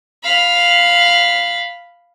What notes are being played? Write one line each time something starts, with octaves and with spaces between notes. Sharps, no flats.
F5 B5